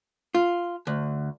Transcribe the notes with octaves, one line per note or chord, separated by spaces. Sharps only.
F4
D2